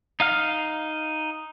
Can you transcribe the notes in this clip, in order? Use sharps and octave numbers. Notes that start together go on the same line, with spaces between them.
D#4 F5 F6